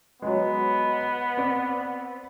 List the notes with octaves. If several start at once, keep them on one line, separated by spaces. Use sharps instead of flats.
F#3 G#3 B3
C4 D5